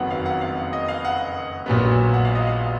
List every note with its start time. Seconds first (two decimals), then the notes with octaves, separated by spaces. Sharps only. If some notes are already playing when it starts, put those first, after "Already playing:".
Already playing: F#1 F2 D#3 F#3 B3 F#5
0.11 F5
0.26 F#5
0.41 F5
0.73 D#5
0.88 F5
1.05 F#5
1.66 A#1 A#2 F#3 B3
2.13 F#5
2.25 F5
2.35 D#5
2.47 F5